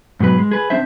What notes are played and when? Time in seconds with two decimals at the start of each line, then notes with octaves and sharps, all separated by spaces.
0.20 G#2 B2 F#3 B4
0.38 G#3
0.51 G#4 B4
0.70 C4 D4 C5 E5